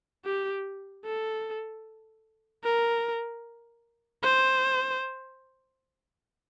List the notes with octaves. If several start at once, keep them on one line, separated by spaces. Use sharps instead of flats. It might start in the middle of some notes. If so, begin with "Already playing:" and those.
G4
A4
A#4
C5